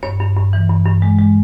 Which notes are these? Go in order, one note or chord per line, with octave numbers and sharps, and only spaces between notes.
G2 C#5
G2
G2
E3
G2
G2
G#3
G#3